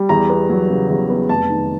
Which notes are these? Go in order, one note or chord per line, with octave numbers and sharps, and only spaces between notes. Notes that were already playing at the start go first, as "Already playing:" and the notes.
Already playing: G3
E2 A#5
B3
F#3
C#3
E2
B3
F1 A5
D#3